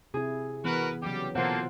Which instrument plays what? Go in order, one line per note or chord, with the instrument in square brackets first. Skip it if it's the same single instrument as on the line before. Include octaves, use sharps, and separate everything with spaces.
[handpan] C3 E4 [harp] G#4
[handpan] E3 B3 [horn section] F#4 A#4 B4
[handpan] C#3 F#3 [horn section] G3 G4
[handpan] B2 E3 C5 [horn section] A#3 C4 A4 [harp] F4 F#5